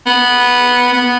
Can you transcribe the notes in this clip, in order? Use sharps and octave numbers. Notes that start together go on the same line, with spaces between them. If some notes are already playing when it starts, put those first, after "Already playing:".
B3
B3